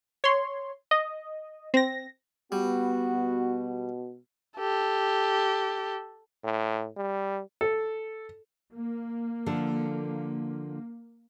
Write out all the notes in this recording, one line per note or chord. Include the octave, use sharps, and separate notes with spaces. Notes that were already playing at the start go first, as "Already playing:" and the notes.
C#5 C6
D#5
C4 A#6
G3 B3 F#4
B2
G4 A4
A2
G3
A4
A#3
D3 F3 A4